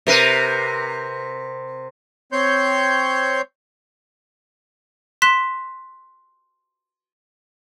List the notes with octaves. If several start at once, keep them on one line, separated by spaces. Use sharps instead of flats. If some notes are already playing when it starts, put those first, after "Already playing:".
C3 A#4 B4
C4 C#5 C6 G6
C6 F#6 B6 E7